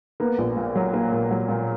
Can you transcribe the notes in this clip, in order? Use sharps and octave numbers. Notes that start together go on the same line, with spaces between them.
A#3 B3
A#1
A#2
F#3
A#3
A#2
F#3
A#2